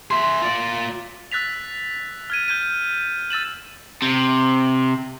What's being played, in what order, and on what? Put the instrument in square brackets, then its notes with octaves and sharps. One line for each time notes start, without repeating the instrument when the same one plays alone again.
[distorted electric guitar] G#4 E5 [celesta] C6
[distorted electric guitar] F4 D5
[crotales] E6 F#6 A6 B6 F7
F6 G#6 D#7
F6 G6 G#6 D#7
E6 A6 E7 F#7
[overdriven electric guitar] C3